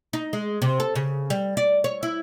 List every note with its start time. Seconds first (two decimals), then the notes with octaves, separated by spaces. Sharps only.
0.13 D#4
0.33 G#3
0.62 C3
0.80 A4
0.96 C#3
1.30 G3
1.57 D5
1.84 C#5
2.03 E4